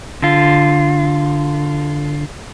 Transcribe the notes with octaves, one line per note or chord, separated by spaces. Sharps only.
D3 F4